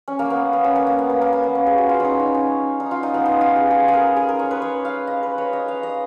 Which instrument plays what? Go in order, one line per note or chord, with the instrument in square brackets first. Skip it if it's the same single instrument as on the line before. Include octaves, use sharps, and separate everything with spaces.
[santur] C#4
A#3
B3
B3
C#4
A#3
A#3
B3
A#3
A#3
A#3
B3
C#4
G#4
F#4
F4
C#4 D#4
D#4
C#4
D#4
F4
D#4
B3
D#4
F4
G#4
G#4
G#4
A#4
G#4
A#4
C#5
B4
C#5
F5
D#5
B4
C#5
D#5
F5
D#5